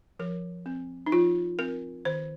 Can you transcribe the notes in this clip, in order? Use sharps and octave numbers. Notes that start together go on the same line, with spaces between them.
F3 A#4
C4
D#4
F3 F4
C4 A#4
D#3 C5